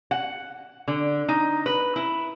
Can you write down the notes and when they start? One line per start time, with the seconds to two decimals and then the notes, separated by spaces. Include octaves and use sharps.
0.11 F#5
0.88 D3
1.28 D#4
1.66 B4
1.96 E4